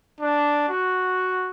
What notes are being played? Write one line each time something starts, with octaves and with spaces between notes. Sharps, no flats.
D4
F#4